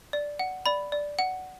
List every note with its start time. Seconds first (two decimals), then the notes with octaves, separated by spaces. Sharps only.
0.13 D5
0.39 F#5
0.66 D5 B5
0.92 D5
1.19 F#5